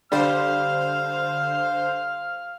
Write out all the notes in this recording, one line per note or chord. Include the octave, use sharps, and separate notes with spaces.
D3 G3 C5 F5 F6